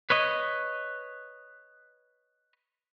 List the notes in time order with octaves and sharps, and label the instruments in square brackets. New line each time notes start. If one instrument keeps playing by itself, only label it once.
[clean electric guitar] B4 C#5 D#5